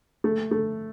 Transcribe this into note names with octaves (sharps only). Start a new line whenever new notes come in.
A3
A3